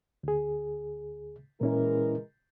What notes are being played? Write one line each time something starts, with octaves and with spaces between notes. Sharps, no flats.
D2 G#4
A#2 E3 G#3 C#4 E4 A#4